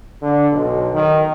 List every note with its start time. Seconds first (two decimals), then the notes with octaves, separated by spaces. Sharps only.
0.22 D3
0.52 B1
0.94 D#3